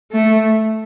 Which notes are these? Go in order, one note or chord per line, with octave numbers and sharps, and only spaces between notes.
A3